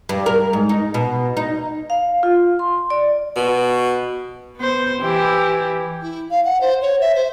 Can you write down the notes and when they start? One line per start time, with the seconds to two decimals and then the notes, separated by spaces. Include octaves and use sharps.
0.09 G2
0.26 A#4
0.53 G#2
0.69 D#4
0.94 B2
1.37 D#4
1.90 F5
2.23 F4
2.59 C6
2.90 D5
3.36 B2
4.57 B3 C5
5.01 E3 E4 G4
6.02 E4
6.31 F5
6.45 F#5
6.61 C5
6.81 C#5
7.01 E5
7.16 C5